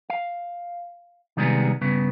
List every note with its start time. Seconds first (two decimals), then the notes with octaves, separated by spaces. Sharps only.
0.10 F5
1.37 C3 D#3 G3 G#3 B3 G#4
1.81 G2 C#3 B3